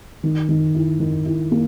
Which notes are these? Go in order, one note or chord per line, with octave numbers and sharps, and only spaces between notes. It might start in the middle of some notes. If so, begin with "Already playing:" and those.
D#3
D#3
E4
D#3
E4
A#3